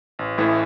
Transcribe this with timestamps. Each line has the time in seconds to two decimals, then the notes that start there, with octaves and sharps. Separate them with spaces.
0.19 A1
0.38 A2 E3 A3 E4